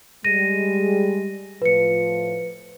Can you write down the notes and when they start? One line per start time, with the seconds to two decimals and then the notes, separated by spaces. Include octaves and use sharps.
0.24 G3 G#3 A#6 D#7
1.62 A2 F3 B4 C#7